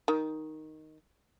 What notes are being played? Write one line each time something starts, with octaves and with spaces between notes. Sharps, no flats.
D#3